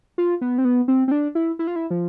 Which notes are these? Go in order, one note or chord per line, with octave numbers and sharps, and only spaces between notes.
F4
B3
C4
B3
C4
C4
D4
E4
E4
F4
E4
F3